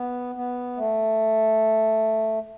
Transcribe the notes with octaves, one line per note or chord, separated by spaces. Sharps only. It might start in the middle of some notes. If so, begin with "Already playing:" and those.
Already playing: B3
B3
A3